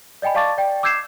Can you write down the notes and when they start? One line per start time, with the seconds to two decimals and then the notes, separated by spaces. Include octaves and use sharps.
0.22 D5 D#5 G5 G#5 B5
0.35 D5 F5 A5 C#6 D6 A6
0.58 D5 G5
0.83 D6 E6 G6 G#6 C7 E7